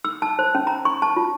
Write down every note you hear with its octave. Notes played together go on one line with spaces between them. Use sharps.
E6
A5
C5
C#4
A#5
C#6
A5
F4